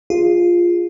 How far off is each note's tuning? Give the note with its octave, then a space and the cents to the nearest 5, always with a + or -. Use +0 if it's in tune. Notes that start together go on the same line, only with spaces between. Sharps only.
F4 +0 G#4 -20